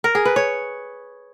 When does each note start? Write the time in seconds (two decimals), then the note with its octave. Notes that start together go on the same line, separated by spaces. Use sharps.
0.04 A#4
0.15 G#4
0.25 B4
0.36 C#5